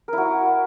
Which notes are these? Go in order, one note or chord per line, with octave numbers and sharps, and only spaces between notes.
E4 F#4 A#4